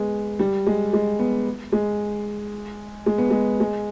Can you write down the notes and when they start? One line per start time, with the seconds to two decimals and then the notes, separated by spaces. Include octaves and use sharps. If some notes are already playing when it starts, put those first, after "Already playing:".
Already playing: G#3 B3
0.39 G3
0.67 G#3
0.93 G#3
1.19 B3
1.72 G#3
3.06 G#3
3.18 B3
3.31 G#3
3.60 G#3